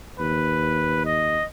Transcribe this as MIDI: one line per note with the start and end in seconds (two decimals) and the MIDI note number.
0.20 1.38 39
0.20 1.03 71
1.06 1.45 75